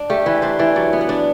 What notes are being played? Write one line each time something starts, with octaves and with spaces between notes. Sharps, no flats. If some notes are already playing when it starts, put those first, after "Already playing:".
Already playing: D4
A3 G4
E3 B4
D4 C5
E3 D5
F#3 D5
B3
F#5
D4